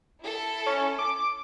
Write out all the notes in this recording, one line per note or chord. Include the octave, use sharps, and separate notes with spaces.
E4 A4
C#4
D6